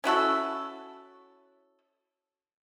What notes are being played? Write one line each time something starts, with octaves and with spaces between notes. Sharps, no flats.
C#4 E4 F#4 A4